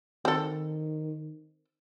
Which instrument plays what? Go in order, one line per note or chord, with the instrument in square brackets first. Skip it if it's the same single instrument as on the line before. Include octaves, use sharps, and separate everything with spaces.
[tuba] D#3 [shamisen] C4 A4